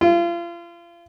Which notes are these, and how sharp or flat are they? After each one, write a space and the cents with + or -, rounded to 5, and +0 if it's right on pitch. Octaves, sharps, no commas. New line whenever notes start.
F4 -35